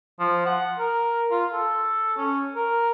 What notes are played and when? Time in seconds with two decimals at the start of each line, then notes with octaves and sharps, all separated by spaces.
0.20 F3
0.46 F#5
0.78 A#4
1.31 F4
1.52 A4
2.17 C#4
2.56 A#4